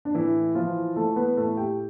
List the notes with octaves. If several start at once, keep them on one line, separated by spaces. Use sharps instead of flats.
D4
A2 E3 E4
E3 F3 F4
E3 A3 A4
B3 B4
A2 A3 A4
G4 G5